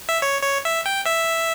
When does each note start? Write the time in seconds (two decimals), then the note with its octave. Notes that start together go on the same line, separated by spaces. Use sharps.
0.09 E5
0.22 C#5
0.43 C#5
0.65 E5
0.86 G5
1.06 E5